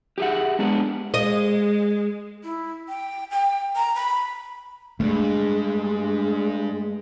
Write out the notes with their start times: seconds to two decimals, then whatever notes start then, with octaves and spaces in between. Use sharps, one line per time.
0.18 G4 G#4 B4 E5 F#5
0.59 G#3 B3 D4 A#4
1.14 G#3 D#5
2.44 E4
2.89 G5
3.31 G5
3.76 A#5
3.96 B5
5.00 D2 G2 G#3 A3